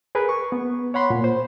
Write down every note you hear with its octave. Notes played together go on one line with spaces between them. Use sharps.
G#4 A#4 B4
C#6
B3
C#5 F#5 B5 C6
A#2
C5